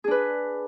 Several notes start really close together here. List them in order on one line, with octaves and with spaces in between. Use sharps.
G#4 D4 B4